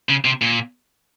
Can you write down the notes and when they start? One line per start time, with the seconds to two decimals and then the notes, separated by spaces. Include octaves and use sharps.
0.09 C#3
0.25 C3
0.42 A#2